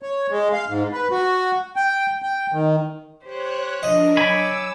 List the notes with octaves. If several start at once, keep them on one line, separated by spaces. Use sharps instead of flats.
C#5
G#3
F5
G#2
B4
F#4
G5
G5
D#3
G4 C5 C#5 F#6
F3 D4 A#4 D#5
F#3 C#5 G#5 B5 D6 E6